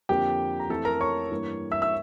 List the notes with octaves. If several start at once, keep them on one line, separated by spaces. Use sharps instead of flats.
F2 D3 F3 A#3 G4 G5
A#5
F2 E3 A3 A4 A5
A#4 A#5
C#5 C#6
G2 E3 A#3
E5 E6
E5 E6